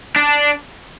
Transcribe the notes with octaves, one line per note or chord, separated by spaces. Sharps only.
D4